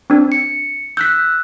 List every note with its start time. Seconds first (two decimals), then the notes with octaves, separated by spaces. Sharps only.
0.10 C4 D4
0.32 C#7
0.97 E6 F#6 G6 B6